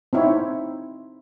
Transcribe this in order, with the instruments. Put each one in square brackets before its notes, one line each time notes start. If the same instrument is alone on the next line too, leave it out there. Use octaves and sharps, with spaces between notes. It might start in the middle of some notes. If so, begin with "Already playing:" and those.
[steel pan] C4 D#4 E4 C#5